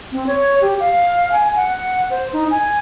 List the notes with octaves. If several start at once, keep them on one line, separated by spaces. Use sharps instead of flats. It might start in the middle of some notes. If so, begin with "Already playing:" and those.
C4
C#5
G4
F5
G#5
F#5
C5
D#4
G#5